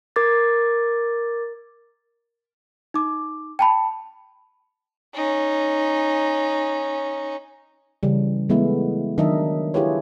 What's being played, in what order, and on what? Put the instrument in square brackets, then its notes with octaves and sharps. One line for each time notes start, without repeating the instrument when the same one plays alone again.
[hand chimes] A#4 D6 G#6 A6
[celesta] D#4 D6
G5 A5 B5
[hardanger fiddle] C#4 D#4
[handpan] C#3 E3 G3
E3 G#3 A3 B3 E4
D#3 F#3 D4 A#4 D#5 E5
E4 F4 G4 G#4 B4 C#5